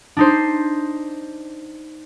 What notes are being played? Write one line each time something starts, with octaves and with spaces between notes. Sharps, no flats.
D4 D#4 C5